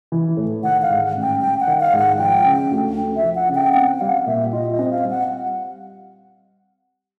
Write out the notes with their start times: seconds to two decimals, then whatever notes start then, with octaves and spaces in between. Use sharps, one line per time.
0.12 E3
0.37 A2
0.63 D#3 F#5
0.82 F5
0.90 G#2
1.15 A1
1.22 G5
1.41 G3 G5
1.60 F#5
1.67 D#3
1.80 F5
1.93 G#2
1.99 F#5
2.19 F3 G5
2.45 C#3
2.71 D2
2.96 A3
3.16 E5
3.22 F3
3.35 F#5
3.49 C#3
3.55 G5
3.74 C4 F#5
3.96 F#5
4.01 G3 F5
4.26 A#2 E5
4.53 F4 D#5
4.72 D#5
4.79 C4
4.91 F5
5.04 G3
5.11 F#5